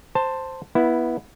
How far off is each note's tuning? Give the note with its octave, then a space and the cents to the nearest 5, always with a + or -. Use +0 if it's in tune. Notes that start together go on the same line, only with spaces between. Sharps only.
C5 +0 A5 +15
B3 -15 E4 +0